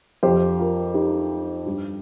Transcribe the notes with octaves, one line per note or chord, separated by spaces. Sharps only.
F2 F3 G4 C5
F4 A#4
D#4 G4
G2 G3